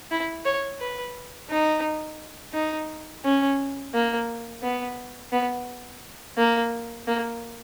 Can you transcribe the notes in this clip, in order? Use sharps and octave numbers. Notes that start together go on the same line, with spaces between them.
E4
C#5
B4
D#4
D#4
C#4
A#3
B3
B3
A#3
A#3